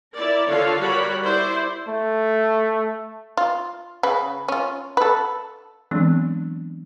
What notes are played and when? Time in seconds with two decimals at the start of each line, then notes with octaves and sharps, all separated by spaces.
0.14 E4 A#4 D5
0.50 D3 F4 A4 C#5 F5
0.79 G3 F#4 A#4 C#5 B5
1.24 E4 C5 D5
1.88 A3
3.37 F4
4.03 C#3 B4
4.48 C#4 F4
4.97 A4 B4
5.91 E3 F#3 G#3 B3 C4 D4